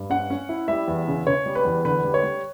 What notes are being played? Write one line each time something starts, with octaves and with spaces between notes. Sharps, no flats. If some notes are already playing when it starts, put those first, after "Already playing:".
Already playing: G2
C#4 F#5
C#4
E4
G3 E5
E2
C#3
C#3 C#5
G3
B4
E2
D3 B4
G3
C#5
G3